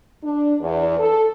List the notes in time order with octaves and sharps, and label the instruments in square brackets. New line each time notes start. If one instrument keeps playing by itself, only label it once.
[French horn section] D4
E2
A4